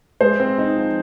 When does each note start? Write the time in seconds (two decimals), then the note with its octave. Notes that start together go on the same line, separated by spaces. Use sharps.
0.21 G#3 C5
0.40 C4
0.58 D#4
0.76 F3